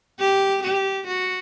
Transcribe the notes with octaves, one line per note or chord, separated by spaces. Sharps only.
G4
G4
F#4